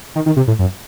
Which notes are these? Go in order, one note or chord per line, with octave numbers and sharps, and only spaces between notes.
D#3
D#3
C3
A2
F#2